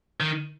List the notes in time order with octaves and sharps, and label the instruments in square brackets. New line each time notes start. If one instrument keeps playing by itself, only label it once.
[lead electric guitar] D#3